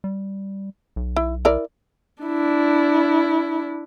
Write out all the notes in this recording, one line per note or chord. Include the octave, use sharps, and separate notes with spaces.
G3
B1
E4
E4 A#4 D5
D4 E4